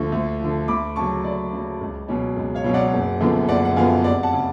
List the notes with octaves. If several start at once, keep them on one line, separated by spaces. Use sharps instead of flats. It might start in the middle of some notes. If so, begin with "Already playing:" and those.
Already playing: D2 D3 F3 C#6
D2
D3 F3
D2 B5 D6
C#3 F#3 A5 C#6
D2 D5
C#3 F#3
C#2
B2 F#3 C#4
C#2
C#5 F5
B2 F#3 C#4
D5 F#5
F#1
F#2 D3 F3 B3
F#1 D5 F#5
F#5
F#2 D3 F3 B3 F5 G#5
F1 D5 F#5
F#5 A5
C#3